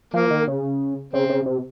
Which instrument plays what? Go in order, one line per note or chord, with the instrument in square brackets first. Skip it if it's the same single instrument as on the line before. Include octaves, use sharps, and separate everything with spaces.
[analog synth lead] F3 [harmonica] A#3
[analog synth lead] D#3
C#3
[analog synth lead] C#3 [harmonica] C4
[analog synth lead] C#3
C3